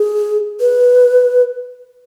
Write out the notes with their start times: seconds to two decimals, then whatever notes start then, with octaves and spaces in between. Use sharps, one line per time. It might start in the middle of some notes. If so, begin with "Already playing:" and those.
Already playing: G#4
0.60 B4